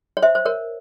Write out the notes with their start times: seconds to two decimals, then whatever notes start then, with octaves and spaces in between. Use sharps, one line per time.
0.17 C#5
0.22 C5 E5
0.35 C5
0.45 A#4 C#5